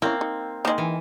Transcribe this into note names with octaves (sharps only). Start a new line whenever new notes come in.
A#3 C4 C#4 E4
D#4
D#3 G#3 A#3 D#5
E3